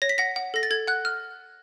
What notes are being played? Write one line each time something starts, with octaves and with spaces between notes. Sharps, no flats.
C#5 A#6
B6
F#5 A#6
F#5
A4 A#6
A6
A4 G#6
F#5 F#6
F6